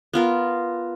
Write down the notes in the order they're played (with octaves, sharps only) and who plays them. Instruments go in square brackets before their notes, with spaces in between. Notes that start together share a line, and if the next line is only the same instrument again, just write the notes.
[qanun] B3 F4 A#4